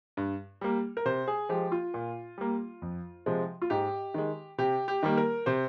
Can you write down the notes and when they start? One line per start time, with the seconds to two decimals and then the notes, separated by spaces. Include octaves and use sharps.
0.17 G2
0.61 G3 A#3
0.97 A#4
1.05 C3 C5
1.28 G#4
1.49 F3 G#3 G4
1.72 F4
1.94 A#2
2.38 G3 A#3
2.82 F2
3.26 C3 F3 G#3
3.62 F4
3.70 G#2 G4
4.14 D#3 G#3
4.58 C3 G4
4.88 G4
5.03 D#3 G3 A#3
5.17 A#4
5.46 C3 C5